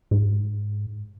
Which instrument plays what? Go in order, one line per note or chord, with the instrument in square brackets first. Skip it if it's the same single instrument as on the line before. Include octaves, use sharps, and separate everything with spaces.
[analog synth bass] G#2